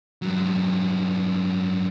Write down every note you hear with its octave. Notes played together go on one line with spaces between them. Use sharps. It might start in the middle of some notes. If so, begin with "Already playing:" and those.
G2 F#3